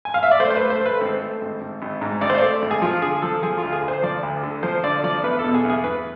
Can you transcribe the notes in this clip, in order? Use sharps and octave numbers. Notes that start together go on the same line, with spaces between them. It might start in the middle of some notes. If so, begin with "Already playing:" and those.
G#5
F5
E5
D5
A3 C5
C5
A3 B4
C5
A3 B4
G#1 C5
A3
G#1
G#1
G#1
G#2
G#1 D5
C5
A3 D5
G#1
G#4
F3 F4
D3 G#4
F3 A4
F3 G#4
D2 F4
G#4
D2
C5
F3 D5
D2
D3
F3 C5
D3 D5
F3 D5
E2 B4
B2 A4
G#4
E2
G#4
E2 B4